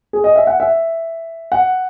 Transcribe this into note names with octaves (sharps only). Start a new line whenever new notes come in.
G#4
D#5
E5
F#5
E5
F#5